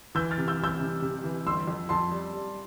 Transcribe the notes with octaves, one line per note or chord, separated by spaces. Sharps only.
E3 E6 G6
F6 A6
C3
E6 G6
E3
E6 G6
C3
C3
E3
G1 C6 E6
F2
F2 A5 C6
G3
G3